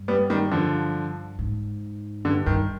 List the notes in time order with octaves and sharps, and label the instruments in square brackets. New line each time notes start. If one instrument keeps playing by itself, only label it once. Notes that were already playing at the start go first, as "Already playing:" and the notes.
Already playing: [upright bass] G2
[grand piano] G3 B3
D#3 G3
D3 F3
[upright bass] G#2
[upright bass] G2 [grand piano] D3
[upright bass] G2 [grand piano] D#3